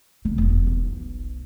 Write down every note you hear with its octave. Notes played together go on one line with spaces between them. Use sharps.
C#3
E1 F#2
B1